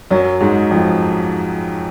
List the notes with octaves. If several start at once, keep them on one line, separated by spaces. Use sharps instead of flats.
F#2 F#3
G#2 G#3
F2 F3